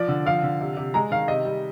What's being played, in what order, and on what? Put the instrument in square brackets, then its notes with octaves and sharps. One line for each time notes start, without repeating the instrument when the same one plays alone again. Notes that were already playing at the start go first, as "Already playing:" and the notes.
Already playing: [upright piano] F3 D5
D3
F3 F5
D3
C3
C3
G#3 A#5
D#3 F5
C3 D#5
G3